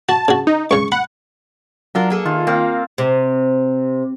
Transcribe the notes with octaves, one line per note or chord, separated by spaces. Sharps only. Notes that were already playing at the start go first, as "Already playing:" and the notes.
F#4 A5
C#3 F#4
D#4
C#2 C#3 C#6
F#5 B5
F#3 D4 F4 A#4
A#3 G#4 A4
D#3 F4
A#3 C4 F4
C3